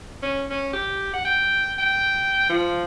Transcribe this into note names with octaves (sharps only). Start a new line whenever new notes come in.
C#4
C#4
G4
F#5
G5
G5
F3